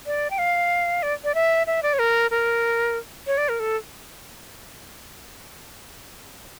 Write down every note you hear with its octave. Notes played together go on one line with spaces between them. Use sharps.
D5
G5
F5
D5
D5
E5
E5
D5
C#5
A#4
A#4
C#5
D5
A#4
A4